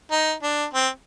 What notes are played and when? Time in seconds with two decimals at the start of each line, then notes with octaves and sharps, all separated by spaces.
0.11 D#4
0.43 D4
0.73 C4